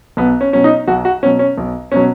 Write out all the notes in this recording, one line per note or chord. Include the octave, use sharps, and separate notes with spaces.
B1 B3
C#4
B2 F#3 C#4
D#4
B1 F#4
F#4
B2 F#3 C#4
C#4
B1
B2 F#3 C#4